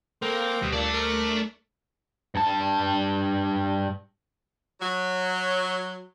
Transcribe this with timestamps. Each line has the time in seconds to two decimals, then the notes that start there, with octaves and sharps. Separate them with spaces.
0.22 A#3 C4 A4
0.62 D2 B2 G3 A#6
0.73 A#2 A3 D4 A4 D5
0.94 A#4
2.35 G2 A5
4.81 F#3